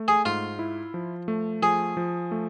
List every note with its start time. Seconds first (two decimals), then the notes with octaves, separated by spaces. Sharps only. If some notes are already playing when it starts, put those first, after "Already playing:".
Already playing: A3
0.08 G#4
0.25 G#2 F4
0.59 E4
0.94 F3
1.28 A3
1.62 F3 G#4
1.97 F3
2.31 A3